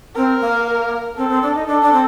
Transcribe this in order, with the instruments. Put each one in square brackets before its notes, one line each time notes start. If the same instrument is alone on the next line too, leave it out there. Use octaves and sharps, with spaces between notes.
[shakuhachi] C4 [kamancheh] A#4
[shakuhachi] A#3
[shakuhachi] C4 [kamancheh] A4
[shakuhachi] C4
D4
D#4
[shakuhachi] D4 [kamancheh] A4
[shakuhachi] D4
C4